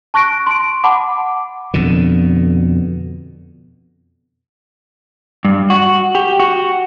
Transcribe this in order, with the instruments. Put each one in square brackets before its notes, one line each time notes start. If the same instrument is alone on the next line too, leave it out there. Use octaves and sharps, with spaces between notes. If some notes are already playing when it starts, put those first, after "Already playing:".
[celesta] A5 C#6 F#6 A#6 D7
C6 D7
F#5 A5 B5 D6
[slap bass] F2 B2 D3
[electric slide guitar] G2
F#4
G4
F#4